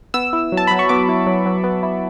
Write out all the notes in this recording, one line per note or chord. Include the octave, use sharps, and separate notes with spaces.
B3 E6
E4
F#3
A5
F#3 B5
C#6
B3 D6
E4
F#3
F#3
B3
E4